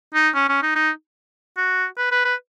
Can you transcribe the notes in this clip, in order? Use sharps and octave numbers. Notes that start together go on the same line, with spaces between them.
D#4
C#4
C#4
D#4
D#4
F#4
B4
B4
B4